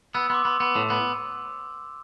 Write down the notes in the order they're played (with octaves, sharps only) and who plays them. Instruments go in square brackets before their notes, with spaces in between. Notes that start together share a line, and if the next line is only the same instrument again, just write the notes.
[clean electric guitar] B3 [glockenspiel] E6
[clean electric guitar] B3 [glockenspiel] C6
[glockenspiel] D6
[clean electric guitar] B3
B3
A2
B3